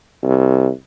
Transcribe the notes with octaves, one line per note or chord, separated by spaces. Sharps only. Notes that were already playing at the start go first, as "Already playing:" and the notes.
C2